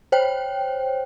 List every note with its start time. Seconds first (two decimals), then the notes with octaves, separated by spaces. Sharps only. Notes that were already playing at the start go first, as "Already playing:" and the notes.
0.12 C5 C#5 G5